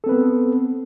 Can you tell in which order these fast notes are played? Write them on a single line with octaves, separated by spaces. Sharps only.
A4 C4 B4 B3